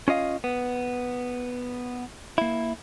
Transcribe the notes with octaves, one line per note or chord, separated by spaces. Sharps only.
C#4 F4 D#5 F5
B3
A#3 E4